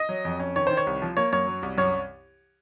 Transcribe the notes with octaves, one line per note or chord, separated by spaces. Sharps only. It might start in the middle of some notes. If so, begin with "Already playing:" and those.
Already playing: D#5
F#3
F2
C#4
D#3 C#5
D#3 C5
C#5
C2
F3
A#3 C#5
F#2 C#5
F#3
C2
F#2 C#5